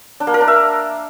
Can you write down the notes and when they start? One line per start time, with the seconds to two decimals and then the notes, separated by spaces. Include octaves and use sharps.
0.20 D4
0.27 A#3
0.34 A#4
0.41 D4
0.48 E5